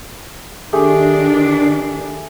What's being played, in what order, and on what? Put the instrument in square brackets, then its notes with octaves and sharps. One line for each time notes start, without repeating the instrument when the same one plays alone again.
[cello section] D#3 D4 [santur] A3 G4 G#4